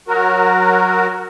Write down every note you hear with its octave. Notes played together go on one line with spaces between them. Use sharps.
F#3 F#4 A#4